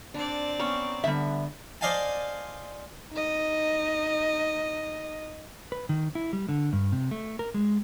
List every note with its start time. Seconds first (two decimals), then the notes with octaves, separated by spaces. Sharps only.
0.14 C4 D4 D5
0.60 B3 C#4 A#5 C#6
1.04 D3 G3 B3 E5
1.81 C5 D5 D#5 F5 G#5 A5
3.11 D#4 D#5
5.72 B4
5.89 D#3
6.15 E4
6.33 G3
6.49 D3
6.73 G2
6.92 C3
7.11 A3
7.39 A#4
7.54 G#3